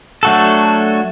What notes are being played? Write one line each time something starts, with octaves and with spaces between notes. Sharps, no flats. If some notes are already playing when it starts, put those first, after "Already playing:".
F#3 A3 D4 F#4 A4